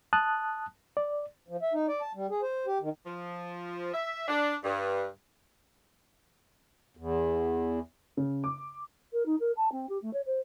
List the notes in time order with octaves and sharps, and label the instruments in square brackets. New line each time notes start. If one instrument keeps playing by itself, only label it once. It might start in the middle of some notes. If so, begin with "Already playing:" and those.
[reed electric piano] A5 D#6 F#6
D5
[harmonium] F3
E5
D#4
D5
A5
G3
G#4
C5
G4
D#3
[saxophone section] F3
E5
D4
G2
[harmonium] E2
[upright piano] C#3
D6
[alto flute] A#4
D#4
A#4
A5
C4
G4
A3
C#5
C5